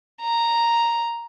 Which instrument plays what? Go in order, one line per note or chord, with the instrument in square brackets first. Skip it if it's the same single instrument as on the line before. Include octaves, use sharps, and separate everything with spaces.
[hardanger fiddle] A#5